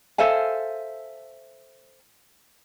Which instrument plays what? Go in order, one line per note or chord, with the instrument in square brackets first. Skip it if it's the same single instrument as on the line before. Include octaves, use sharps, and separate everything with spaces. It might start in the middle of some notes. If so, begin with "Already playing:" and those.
[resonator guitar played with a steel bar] A4 C5 E5 F5 G#5